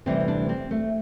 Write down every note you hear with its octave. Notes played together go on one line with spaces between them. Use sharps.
D2 C3 E3 G3 C4
C4
D4
C4
A3